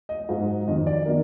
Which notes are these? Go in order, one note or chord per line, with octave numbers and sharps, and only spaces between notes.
D#5
G#2 F#3
F2 D#3 F#3 D#5
D5
D#3 F#3 A#4